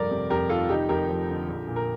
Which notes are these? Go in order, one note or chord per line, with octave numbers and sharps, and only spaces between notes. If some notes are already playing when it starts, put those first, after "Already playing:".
Already playing: F1 G2 A#4 D5
C3
F2 G4 A#4
D#3 F4 A4
F1 D#4 G4
F2 G4 A#4
F3
D3
A#1
A#2
A#4